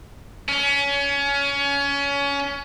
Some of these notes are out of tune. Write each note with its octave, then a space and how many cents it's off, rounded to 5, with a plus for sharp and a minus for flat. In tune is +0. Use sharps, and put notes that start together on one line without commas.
C#4 +25